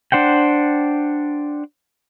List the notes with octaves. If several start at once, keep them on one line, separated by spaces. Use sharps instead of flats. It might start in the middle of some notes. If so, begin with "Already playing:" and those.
D4 C5 F#5 G5